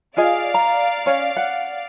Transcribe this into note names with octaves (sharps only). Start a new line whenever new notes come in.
F4 G#4 D5 D#5 F5
A#5
C#4 C#5
F#5